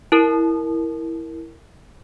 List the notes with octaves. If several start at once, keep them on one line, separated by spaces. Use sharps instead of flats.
E4 A#4